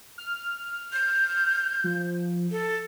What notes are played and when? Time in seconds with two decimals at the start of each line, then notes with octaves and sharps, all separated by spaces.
0.18 F6
0.93 G6
1.84 F3
2.51 A4